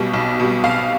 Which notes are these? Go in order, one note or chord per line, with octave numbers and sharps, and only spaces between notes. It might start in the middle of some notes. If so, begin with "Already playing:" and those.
Already playing: B1 B2 G3
B1
B2 G3
B1 F5